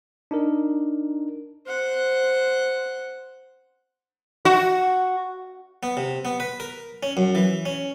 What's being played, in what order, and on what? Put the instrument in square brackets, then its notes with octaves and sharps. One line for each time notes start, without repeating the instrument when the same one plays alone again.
[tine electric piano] D4 D#4 A#4
[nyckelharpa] C5 F#5
[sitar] F#4
[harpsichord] B3
C3
B3
B4
A#4
C#4
F#2
E3
C#4